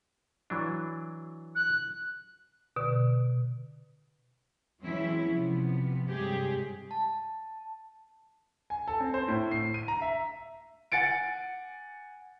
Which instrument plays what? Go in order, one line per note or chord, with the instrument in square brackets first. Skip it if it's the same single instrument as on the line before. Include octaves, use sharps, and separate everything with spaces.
[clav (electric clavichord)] E3 F#3 D4
[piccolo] F#6
[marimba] B2 D3
[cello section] E3 F#3 G#3 C4 C#4 E4
C3 F3 B3
G2 C3 F#3 G#3 G4 G#4
[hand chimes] A5
[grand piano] G#5
A4
C4
C5
A2
C7
D#7
A#5
E5
[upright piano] F#5 G#5 A6 C#7 D7